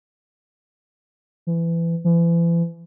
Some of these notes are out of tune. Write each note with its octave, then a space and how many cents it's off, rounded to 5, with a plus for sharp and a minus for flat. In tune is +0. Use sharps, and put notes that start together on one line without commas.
E3 +25
E3 +40